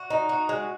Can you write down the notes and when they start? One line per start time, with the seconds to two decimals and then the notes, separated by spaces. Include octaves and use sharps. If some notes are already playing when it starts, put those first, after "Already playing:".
Already playing: F#4
0.10 D#4
0.29 F#4
0.49 G#3